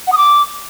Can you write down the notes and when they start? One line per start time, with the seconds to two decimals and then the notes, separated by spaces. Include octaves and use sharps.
0.07 F#5
0.12 D#6
0.18 D6